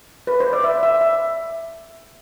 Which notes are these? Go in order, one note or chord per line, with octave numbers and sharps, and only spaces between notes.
B4
C5
D5
E5
E5
E5